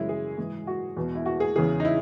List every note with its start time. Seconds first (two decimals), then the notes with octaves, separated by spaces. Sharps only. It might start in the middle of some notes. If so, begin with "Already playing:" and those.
Already playing: F#2 C#3 E3 G#3 E4
0.09 G#4
0.37 G#2 E3
0.67 F#4
0.96 E2 B2
1.15 E4
1.26 F#4
1.40 G#4
1.56 E2 C#3 E3 G#4
1.80 D#4
1.85 E4